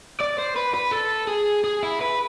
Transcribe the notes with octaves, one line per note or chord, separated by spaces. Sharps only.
D5
C5
B4
B4
A4
G#4
G#4
E4
B4